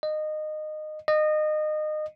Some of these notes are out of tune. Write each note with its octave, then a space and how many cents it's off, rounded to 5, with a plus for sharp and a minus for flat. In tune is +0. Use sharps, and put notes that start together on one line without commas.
D#5 -20
D#5 -25